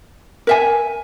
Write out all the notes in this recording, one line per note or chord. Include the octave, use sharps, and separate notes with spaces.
A#4 E5 G#5